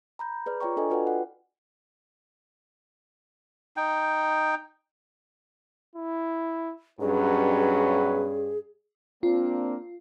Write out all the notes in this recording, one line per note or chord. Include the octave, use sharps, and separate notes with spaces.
A#5 B5 G6
G#4 B4 D5 F6
F4 C#5 D5 G5 A#5 C#6
D4 A4 D#5 G#5
F4 F#4 B4 D5 F#5 G5
F#5
D#4 G5
E4
B1 G2 F#3 C#4 G#4 B4
A#3 C4 D4 F4